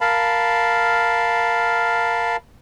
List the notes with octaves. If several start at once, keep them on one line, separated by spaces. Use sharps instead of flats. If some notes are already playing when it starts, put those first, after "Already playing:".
A#4 F5 A5 B5